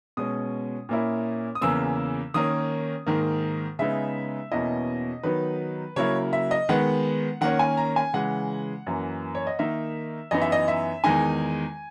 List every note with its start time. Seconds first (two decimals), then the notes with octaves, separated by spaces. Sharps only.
0.17 B2 G#3 C#4 D#6
0.89 A#2 A#3 C#4 E4
1.55 D#6
1.61 E2 C#3 E3 A#3 E6
2.34 D#3 A#3 C#4 D#6
3.06 G#2 D#3 A#3
3.79 C#3 G#3 B3 D#4 E5
4.51 E2 B2 A#3 C#4 E4 D#5
5.23 D#3 F#3 B3 D#4 B4
5.96 C#3 F#3 A#3 E4 C#5
6.33 E5
6.51 D#5
6.69 D#3 G#3 B3 F#5
7.41 D#3 A#3 C#4 F#5
7.59 G#5
7.77 A#5
7.96 G#5
8.13 C#3 E3 G#3 F#5
8.87 F#2 E3 A#3
9.35 C#5
9.47 D#5
9.59 D#3 A#3 D#4 E5
10.31 F#2 E3 B3 D#4 D#5
10.42 E5
10.52 D#5
10.68 E5
11.04 E2 D#3 G#3 D#4 G#5